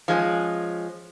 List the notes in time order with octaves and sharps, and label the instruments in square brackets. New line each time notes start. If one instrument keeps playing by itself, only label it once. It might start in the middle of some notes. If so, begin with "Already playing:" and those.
[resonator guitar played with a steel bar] F3 G#3 A3 C#4